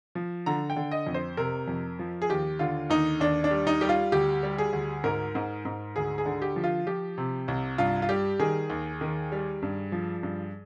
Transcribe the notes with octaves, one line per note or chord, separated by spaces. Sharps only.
F3
D3 A#5
G5
D3
D#5
F2
C5
C3 A#4
F2
F3
G#4
D#2 G4
D3 F4
D#2 D#4
D#2 D4
D4
G3
D#4
G3 G4
F4
D2 G4
G3
G#4
D2
G#2 A#4
G#2
G#2
D2 G#4
G#4
D3
G4
F3
F4
F3 G4
C3
C2
G2 F4
F4
G3 G4
D#3 G#4
D#2
D#3
G3
G2
F3
G2